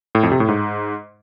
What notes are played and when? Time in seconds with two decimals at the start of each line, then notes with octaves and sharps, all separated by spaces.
0.15 A2
0.23 F2
0.32 C3
0.40 A2
0.48 G#2